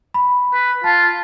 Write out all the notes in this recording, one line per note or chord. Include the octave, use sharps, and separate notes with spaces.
B5
B4
F4 A5